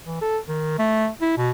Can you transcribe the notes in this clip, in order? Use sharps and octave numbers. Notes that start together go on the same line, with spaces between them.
E3
A4
D#3
A3
E4
B2